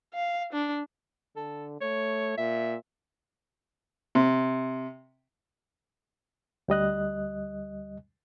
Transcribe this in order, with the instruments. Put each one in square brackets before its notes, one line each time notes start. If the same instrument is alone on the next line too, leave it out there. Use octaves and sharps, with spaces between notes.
[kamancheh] F5
D4
[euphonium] D3 [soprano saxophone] A4
[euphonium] A3 [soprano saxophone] C#5
[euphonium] A#2 [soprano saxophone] E5
[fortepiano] C3
[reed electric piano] D2 G3 D#5 F#6